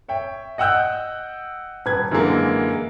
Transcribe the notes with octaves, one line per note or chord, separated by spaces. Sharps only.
C#5 E5 G5
D#5 F#5 G5 E6 F#6 G6
D#1 B4 G#6
F#2 D3 E3 G#3 A#3